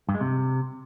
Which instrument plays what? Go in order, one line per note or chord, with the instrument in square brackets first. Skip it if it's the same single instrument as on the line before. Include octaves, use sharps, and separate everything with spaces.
[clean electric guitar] G2
G#3
C3